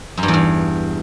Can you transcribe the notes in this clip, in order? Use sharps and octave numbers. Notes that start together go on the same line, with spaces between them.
F#2
G2
E2
G2